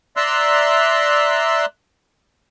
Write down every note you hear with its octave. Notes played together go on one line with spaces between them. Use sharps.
D5 E5 A#5 C6 E6 F#6